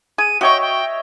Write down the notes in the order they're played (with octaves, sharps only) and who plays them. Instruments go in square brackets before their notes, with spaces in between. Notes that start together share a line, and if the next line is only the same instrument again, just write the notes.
[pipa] G#4 [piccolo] D#7
[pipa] F#4 C#6 [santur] C#5 D#5 E5 [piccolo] G5
[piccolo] G5